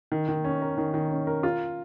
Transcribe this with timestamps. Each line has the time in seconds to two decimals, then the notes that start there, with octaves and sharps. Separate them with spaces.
0.12 D#3
0.28 D#3
0.44 C#4
0.62 A#4
0.78 D#3
0.94 D#3
1.11 C#4
1.27 A#4
1.43 F4